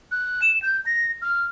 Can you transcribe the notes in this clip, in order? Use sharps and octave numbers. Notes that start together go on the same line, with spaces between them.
F#6
E7
G6
A#6
F6